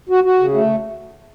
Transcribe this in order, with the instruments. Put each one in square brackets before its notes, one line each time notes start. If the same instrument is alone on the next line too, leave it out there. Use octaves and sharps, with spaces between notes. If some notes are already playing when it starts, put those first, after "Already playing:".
[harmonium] F#4
F#4
C#3
A3